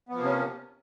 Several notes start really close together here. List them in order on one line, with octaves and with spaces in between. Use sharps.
B3 F3 A#3 C3 C#4